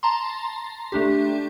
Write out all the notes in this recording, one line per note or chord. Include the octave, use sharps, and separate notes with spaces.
A5 A#5 C6
A3 D4 G4